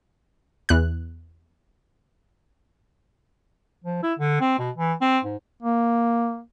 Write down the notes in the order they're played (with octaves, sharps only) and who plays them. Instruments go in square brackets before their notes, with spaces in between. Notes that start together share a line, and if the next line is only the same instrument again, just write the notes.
[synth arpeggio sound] E2 F#6
[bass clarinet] F3
E4
D3
C4
B2
E3
C4
G#2
[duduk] A#3